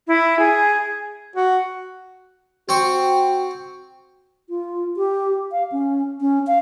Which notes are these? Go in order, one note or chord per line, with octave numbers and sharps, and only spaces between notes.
E4
G#4
F#4
C4 F#4 C6 C#6
F4
G4
F5
C#4
C#4
F5